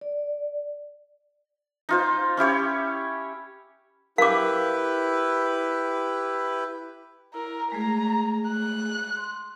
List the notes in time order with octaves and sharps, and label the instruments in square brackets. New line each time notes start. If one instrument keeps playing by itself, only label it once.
[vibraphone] D5
[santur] D#4 F4 C5
C#4 E4 G4 C#5
[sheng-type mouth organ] E4 G4 B4 [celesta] A#4 [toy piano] F5 D6
[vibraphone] E4 [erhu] A#4
[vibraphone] G#3 A3 G#4 [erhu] A#5
[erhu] F#6
[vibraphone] C6